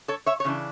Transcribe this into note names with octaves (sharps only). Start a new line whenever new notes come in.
A4 C#5
C#5 E5
C#5
C#3 E3 D4